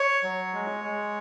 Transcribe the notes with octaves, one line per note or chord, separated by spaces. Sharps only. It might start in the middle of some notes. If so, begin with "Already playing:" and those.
Already playing: C#5
F#3
G#3
G#3